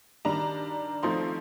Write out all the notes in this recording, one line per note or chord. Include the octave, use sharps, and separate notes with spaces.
D#3 G3 D4 A#5
F3 A3 C4 D#4 C6